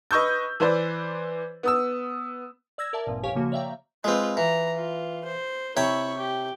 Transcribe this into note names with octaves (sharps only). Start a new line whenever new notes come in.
B4 D#5 C#6 E6 G6
E3 B4 C5 D5
B3 D#6 E6
D5 E6 G#6 A#6
A#4 D5 E5 A5
G#1 G2 A#2 F3
A1 F2 G4 C#5 F5 G#5
C#3 F3 A#3 F#4
C#5 D5 E5 F5 G5 A#5
G#3 C4 F4 B4
E3 A#5
F4
C5
C3 E4 C#5 G5 C#6
G4